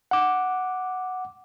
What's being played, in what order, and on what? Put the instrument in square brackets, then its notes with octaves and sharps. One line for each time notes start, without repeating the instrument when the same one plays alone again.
[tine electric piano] F#5 D6